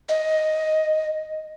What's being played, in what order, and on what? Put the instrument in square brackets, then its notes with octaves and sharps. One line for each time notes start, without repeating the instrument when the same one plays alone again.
[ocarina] D#5